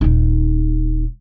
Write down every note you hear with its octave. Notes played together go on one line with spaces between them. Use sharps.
D#1 D#4